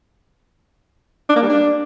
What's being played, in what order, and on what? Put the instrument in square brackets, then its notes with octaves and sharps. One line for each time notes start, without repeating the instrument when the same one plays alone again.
[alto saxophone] D4
A#3
G3
D4